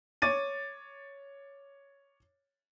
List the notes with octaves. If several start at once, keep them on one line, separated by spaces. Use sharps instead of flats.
C#5 D6 A6 D#7